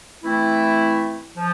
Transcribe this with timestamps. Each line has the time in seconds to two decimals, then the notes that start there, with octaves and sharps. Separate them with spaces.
0.23 E3 A3 C4 E4
1.38 F3